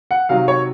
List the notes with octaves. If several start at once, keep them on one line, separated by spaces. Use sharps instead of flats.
F#5
C3 D#3 F#3 F5
C#5